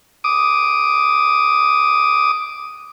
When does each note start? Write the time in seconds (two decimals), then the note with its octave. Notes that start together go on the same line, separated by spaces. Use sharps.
0.24 D6 D#6